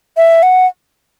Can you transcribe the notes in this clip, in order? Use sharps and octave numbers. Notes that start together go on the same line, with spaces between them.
E5
F#5